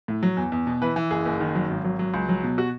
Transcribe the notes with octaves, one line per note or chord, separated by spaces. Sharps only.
A2
F#3
E2
E2
B2
E3 B4
E3
F#1 G#4
F#1
D#3
F#3
G#1
F#3
F#3
C#2
F#3
B2
F#4